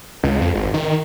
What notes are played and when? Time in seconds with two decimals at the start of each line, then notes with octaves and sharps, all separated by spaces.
0.23 C#2
0.41 F2
0.54 G#1
0.74 D#3